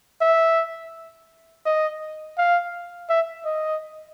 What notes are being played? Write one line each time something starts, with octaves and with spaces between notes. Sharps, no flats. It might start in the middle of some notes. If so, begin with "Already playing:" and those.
E5
D#5
F5
E5
D#5